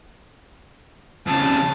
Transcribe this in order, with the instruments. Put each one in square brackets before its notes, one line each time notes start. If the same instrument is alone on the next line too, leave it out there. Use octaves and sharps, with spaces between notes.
[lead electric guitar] F2 C#3 [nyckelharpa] A5